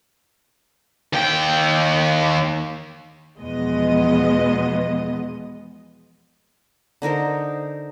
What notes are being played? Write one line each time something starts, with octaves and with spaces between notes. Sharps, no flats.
D#2 G5
E2 B2 F3 G#3 B3 D#5
D3 D#4 A#4 C5